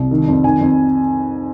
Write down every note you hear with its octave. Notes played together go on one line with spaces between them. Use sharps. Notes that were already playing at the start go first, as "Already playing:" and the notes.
Already playing: C2
D#3
F2
D#3 G#5
F2